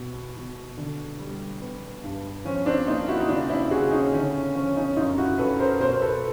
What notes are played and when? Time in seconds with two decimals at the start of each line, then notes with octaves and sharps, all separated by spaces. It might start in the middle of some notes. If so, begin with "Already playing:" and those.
Already playing: B2 B3
0.36 B2
0.77 D3
1.20 G3
1.62 B3
2.04 G2
2.45 F3 C#4
2.66 C4 D4
2.87 A#3 D#4 F4
3.08 E4 F#4
3.20 D#4
3.29 C#3 D4 E4
3.50 D4 E4
3.71 C#3 F#4 G#4
3.91 C#4 D#4
4.13 D3 C#4
4.34 C#4
4.55 F3 C#4
4.76 C#4 D#4
4.97 F#2 D#4 F4
5.18 E4 F#4
5.38 F#2 A4 B4
5.59 A#4 C5
5.80 B2 A#4 C5
5.93 C5
6.02 A4 B4